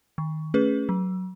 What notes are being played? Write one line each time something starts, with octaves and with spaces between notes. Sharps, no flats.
D#3
A3 C#4 G#4 B4
F#3